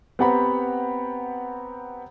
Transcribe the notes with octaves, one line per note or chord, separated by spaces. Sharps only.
B3 C4 G4 F#5 A#5 B5